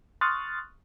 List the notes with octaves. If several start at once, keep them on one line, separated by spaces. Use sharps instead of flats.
C6 C#6 D#6 F6 F#6 A6